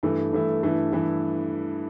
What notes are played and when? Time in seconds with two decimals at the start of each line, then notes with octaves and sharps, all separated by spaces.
0.03 G2 E3 A3 E4
0.33 G2 E3 A3 E4
0.63 G2 E3 A3 E4
0.92 G2 E3 A3 E4